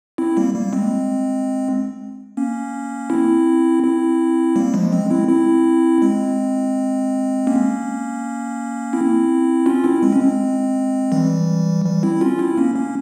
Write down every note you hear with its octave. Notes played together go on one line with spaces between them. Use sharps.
C4 E4
G3 A#3
G3 A#3
G#3 C4
A#3 C#4
C4 E4
C4 E4
G3 A#3
F3 G#3
G#3 C4
C4 E4
C4 E4
G#3 C4
A#3 C#4
C4 E4
C#4 F4
C4 E4
G#3 C4
C#4
G#3 C4
E3 G3
E3 G3
C4 E4
C#4 F4
C4 E4
A#3 C#4
A#3 C#4